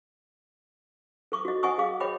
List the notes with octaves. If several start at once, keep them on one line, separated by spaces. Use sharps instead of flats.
A4 C#6 D6
F#4 D#5
D#5 F#5 G#5 C#6 D#6
G#4 F5 D6
C#5 D#5 G5 B5 D6